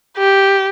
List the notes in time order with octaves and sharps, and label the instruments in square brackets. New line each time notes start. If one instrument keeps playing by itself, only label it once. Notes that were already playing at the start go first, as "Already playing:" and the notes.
[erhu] G4